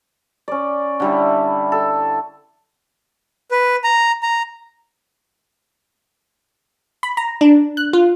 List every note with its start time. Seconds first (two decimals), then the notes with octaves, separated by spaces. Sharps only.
0.48 C#4 D5
1.00 D3 G3 E4
1.72 A4
3.51 B4
3.84 A#5
4.23 A#5
7.03 B5
7.17 A#5
7.41 D4
7.77 F#6
7.93 F4